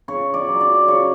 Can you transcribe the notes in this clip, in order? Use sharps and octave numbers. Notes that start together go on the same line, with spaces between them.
C#3 C#5
D5
F#3
D5
C#3 C#5